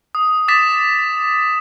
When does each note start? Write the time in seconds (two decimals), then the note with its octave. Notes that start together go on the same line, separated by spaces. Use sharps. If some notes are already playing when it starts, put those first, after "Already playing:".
0.15 D#6
0.48 D6 D#6 A6 B6 E7